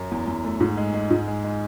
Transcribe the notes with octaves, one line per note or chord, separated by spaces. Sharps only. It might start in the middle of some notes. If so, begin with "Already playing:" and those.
Already playing: F#2
E2
E2
A3
G#2
G#3
G#3
G#2
G#3
G#3